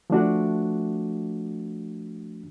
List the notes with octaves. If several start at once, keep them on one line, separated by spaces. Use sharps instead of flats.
F3 A3 D4 F#4